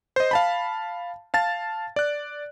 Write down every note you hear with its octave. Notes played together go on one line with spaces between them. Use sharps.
C5 D#5
F5 A5 B5
F5 A5 A6
D5 F#6